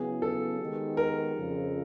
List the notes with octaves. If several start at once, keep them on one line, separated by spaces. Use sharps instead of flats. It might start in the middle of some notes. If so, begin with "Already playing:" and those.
Already playing: C#3 F#3 B3 E4 G#4
A4
D#3 G#3 B3 D#4 G4
A#4
F2 C#3 F3